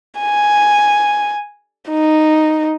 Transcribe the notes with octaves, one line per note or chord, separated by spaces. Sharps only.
G#5
D#4